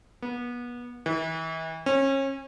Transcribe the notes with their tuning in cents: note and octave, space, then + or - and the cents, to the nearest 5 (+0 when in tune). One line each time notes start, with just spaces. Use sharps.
B3 -30
E3 -35
C#4 -30